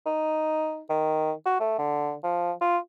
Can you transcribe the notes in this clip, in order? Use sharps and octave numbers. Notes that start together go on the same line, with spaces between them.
D#4
D#3
F#4
A3
D3
F3
F4